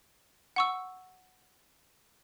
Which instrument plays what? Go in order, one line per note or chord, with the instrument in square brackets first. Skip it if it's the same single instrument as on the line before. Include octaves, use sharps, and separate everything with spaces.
[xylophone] F#5 C#6 E6